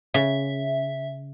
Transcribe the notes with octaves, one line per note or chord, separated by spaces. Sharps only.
C#3 E5